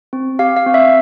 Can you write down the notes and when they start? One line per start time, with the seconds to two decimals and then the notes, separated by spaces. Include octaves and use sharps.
0.13 C4
0.39 G4 F5
0.57 F5
0.66 C4
0.74 E5